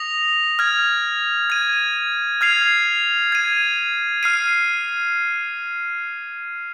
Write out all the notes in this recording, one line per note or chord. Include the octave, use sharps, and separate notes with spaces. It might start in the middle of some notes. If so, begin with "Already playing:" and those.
Already playing: D#6 A#6 F7
F6 G#6 F7
G#6 D#7
F6 G#6 C7 F7
G#6 D#7
F6 C7 D#7